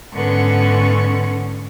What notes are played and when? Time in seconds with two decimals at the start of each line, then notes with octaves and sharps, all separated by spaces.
0.14 G#2 D3 B3 C#4 C#6